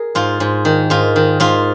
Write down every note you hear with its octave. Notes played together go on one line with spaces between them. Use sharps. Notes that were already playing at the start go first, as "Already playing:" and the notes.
Already playing: G#4 A#4
G#2 F4
G#2
D#3
G#2 F4
D#3
G#2 F4